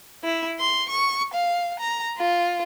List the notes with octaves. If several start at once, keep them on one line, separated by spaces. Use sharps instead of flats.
E4
C6
C#6
F5
A#5
F4